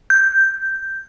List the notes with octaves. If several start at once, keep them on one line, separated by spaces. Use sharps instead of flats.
G6